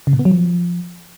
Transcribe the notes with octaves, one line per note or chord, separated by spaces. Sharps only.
C#3
A#2
B3
F#3
F3